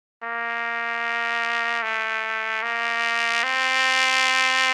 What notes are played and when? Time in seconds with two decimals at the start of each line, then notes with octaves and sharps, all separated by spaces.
0.23 A#3
1.83 A3
2.63 A#3
3.43 C4